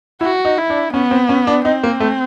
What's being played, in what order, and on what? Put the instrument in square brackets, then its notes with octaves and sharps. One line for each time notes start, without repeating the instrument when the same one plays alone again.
[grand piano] E4 [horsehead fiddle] F#4
[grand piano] D#4
[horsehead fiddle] E4
[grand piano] D4
[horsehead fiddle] B3 [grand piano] C#4
[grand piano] C4
C#4
D4
[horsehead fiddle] C4 [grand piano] D#4
[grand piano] A#3
A3